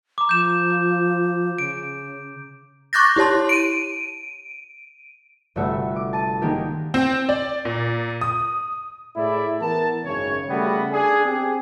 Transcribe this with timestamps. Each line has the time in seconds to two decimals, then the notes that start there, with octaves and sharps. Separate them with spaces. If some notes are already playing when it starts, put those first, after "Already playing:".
0.18 A#5 D6
0.29 F3 G6 E7
0.70 G6
1.59 C#3 D7
2.93 C#6 D6 F#6 G6 A6 A#6
3.16 E4 G4 C#5 A5 C6
3.49 D7 D#7
5.56 G1 G2 C3 A3 F#4 E5
5.96 D6
6.13 A5 D#7
6.42 D#3 G#3 A#3 F#4 G4 A#4
6.94 C4
7.29 D5
7.65 A#2
8.21 D#6
9.16 A2 E4 G#4 D5 E5
9.61 E3 B3 A#4 A5
10.04 G#1 F#2 C#3 C#5
10.49 C#3 G3 A3 B3 F#4
10.92 D4 G#4
11.25 C4 G4 G#4